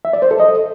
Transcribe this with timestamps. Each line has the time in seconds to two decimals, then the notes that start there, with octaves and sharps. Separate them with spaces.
0.05 E5
0.13 D5
0.22 C5
0.31 A4
0.40 D#5